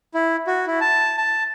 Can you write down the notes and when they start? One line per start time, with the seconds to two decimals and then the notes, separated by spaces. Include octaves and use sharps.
0.14 E4
0.47 F#4
0.67 E4
0.81 A5
1.18 A5